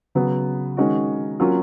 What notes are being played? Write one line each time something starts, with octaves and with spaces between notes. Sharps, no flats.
C#3 F#3 B3
D#3 G#3 C#4 F#4
F#3 A#3 C#4 F4